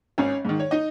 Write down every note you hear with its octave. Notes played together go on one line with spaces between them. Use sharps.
G#1 C#4 C#5
G#2 D#3
C#5
D#4 D#5